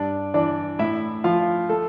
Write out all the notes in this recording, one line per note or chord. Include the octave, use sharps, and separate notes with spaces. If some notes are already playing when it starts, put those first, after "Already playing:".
Already playing: G2 D4 D5
E3 D4 D5
A2 E4 E5
F3 F4 F5
A3 A4